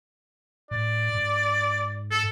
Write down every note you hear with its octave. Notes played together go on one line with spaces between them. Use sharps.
A2 D5
G#2
A4